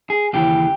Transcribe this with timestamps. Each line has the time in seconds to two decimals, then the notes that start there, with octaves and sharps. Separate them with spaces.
0.10 G#4
0.33 D#2 C#3 E3 G4